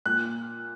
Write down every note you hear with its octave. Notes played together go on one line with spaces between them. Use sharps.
A#2 F#6